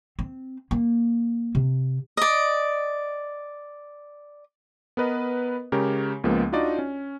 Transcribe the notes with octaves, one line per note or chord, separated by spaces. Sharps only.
C4
A#3
C3
D5 D#5
B3 A#4 B4 D#5
C#3 G#3 G4 A#4 C#5
C#2 F3 G#3 A#3 B3
D4 D#4 F4 F#4 D5 D#5
C#4